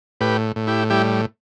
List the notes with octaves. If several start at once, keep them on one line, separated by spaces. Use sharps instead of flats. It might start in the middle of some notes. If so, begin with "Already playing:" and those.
A2 G4 B4
A2
E4 G4
G3 E4 G4